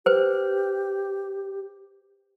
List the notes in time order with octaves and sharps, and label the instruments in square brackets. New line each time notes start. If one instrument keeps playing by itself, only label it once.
[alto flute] G4 [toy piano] B4 C5